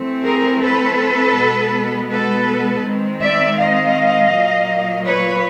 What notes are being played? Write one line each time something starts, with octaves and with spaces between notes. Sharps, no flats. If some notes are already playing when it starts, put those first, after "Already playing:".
Already playing: E3 A3 C4
G#4 A#4
A4 B4
B2 G#3 B3
A4 B4
D#3 G#3 C4
D5 E5
D#5 F5
A#2 F#3 A#3
B4 C#5